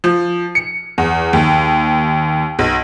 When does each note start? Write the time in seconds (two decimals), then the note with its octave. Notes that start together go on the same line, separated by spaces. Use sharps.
0.04 F3
0.55 C#7
0.98 E2
1.33 D#2
2.59 B1